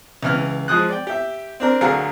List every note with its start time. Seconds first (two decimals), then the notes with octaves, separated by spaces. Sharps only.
0.23 C#2 E3 F6
0.68 F3 G#3 D#6 F#6
0.89 D5 G5
1.07 G4 E5
1.60 C4 D4 A#4
1.81 D2 D3 F#3 G#4 A#4 F5